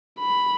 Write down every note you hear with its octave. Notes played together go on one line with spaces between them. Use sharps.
B5